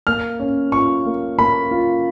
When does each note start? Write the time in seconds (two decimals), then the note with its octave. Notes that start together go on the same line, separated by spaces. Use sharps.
0.07 A#3 F6
0.40 C#4
0.72 F4 C#6
1.06 A#3
1.38 A#3 B5
1.71 F4